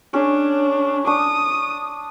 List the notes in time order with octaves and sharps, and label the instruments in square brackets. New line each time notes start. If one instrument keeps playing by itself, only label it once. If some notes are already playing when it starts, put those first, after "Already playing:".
[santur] C#4 G#4 C#5 [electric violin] D4
[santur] D4 A5 C#6 [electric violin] D#6